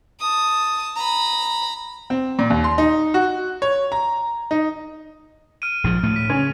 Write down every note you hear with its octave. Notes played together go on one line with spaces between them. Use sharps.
A5 D#6
A#5 B5
C4
A#2
D#2
C6
D#4
F#4
C#5
A#5
D#4
F6 D7 D#7
A#1 G#2 F3
D2 A2 A3
B6
C#3 C#4